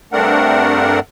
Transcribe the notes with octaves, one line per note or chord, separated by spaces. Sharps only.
G2 A3 C4 D4 A#4 F#5